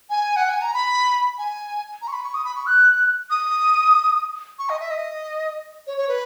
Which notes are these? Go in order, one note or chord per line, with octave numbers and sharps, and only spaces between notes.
G#5
F#5
G#5
A#5
B5
G#5
A#5
C#6
B5
C#6
D#6
B5
C#6
F#6
D#6
C#6
D#5
E5
D#5
C#5
C#5
B4